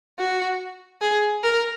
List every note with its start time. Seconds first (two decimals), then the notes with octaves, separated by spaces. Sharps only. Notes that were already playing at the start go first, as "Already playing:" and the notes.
0.19 F#4
1.01 G#4
1.44 A#4